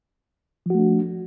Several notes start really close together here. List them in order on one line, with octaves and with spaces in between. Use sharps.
F3 F#4 A3 D4